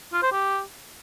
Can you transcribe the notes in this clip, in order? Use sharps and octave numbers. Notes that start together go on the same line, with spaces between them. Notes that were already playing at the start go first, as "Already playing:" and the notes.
F4
C5
G4